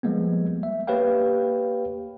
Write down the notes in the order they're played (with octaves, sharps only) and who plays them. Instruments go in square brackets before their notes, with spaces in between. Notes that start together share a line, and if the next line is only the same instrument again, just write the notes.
[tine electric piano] F3 G3 G#3 A#3 B3
E5
A#3 G4 B4 C#5 F5 G5